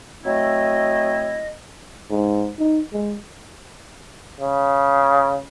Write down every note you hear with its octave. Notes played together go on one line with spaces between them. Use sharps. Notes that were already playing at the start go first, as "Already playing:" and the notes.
F#3 A3 C4 E4 D#5
G#2
D#4
G#3
C#3